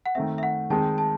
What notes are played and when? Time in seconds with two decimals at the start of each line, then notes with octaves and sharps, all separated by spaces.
0.06 F#5
0.15 D#3 A3 C4 E5
0.38 E5
0.43 F#5
0.70 D#3 G#3 C4 D#4 A5
0.98 A5